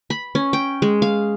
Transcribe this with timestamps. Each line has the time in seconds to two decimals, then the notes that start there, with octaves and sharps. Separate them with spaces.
0.10 B5
0.35 C#4
0.53 G5
0.82 G#3
1.02 F5